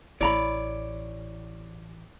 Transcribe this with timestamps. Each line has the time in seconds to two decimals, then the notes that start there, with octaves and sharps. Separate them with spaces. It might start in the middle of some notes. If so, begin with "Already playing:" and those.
0.21 A1 E4 C#5 D5 A#5 B5